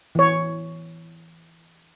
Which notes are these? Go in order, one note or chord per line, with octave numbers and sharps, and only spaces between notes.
E3 C#5